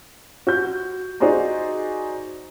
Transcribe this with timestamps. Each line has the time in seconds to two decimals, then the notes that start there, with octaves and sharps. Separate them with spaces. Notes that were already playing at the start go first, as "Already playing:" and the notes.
0.47 F#4 G6
1.20 D#4 F#4 G#4 C5 D5 A#5